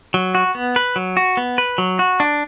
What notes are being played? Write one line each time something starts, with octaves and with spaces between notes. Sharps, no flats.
F#3
F#4
B3
B4
F#3
F#4
B3
B4
F#3
F#4
D4